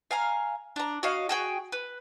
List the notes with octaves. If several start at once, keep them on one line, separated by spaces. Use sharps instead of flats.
F5 G#5 A#5
D4 A#5
F#4 C#5 D#5 F5
F#4 G#4 G5
B4